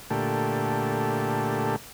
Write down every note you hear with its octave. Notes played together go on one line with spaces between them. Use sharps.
A#2 D3 A3 G4